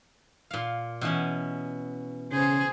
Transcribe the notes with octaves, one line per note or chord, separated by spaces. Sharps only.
A#2 F5
B2 E3 C#4
C#3 G#4 C5